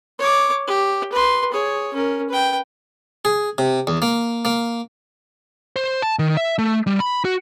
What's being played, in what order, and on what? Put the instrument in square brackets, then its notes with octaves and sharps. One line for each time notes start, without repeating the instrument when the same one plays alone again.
[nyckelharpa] C#5 D6
G4
B4 C6
G#4 C#5
C#4 A#4
B4 G5
[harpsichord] G#4
C3
E2
A#3
A#3
[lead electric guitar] C5
A5
D#3
E5
A3
G3
B5
F#4